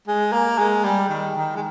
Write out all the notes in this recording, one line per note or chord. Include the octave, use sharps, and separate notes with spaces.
G#3
A#3
G#3
G3
D#3
D#3
G#3